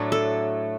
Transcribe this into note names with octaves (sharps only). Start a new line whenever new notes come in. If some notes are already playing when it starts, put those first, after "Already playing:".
Already playing: A2 F#3 A3 D4
A4